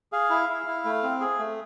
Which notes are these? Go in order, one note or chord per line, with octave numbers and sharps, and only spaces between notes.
G#4 F5
E4
E4
E4
A3
C4
G#4
A3